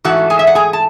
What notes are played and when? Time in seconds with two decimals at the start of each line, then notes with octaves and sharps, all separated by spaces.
0.04 G#2 E3 A3 F#4 F#5
0.30 G#4 G#5
0.39 E5
0.47 F#5
0.55 G#4 G#5
0.73 A5